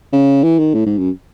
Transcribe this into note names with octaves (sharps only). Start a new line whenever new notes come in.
C#3
E3
D#3
A2
G#2
F#2